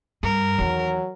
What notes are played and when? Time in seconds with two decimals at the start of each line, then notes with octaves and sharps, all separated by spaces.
0.23 G2 A#4
0.59 E2 D#3 F#3